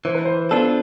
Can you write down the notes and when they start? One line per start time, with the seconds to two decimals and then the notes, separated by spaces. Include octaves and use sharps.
0.05 E3 C5
0.14 B4
0.25 C5
0.51 B3 D4 F4 A4